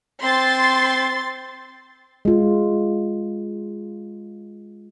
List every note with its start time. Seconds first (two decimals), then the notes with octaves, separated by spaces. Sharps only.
0.23 C4 C6 A6
2.25 G#3 F4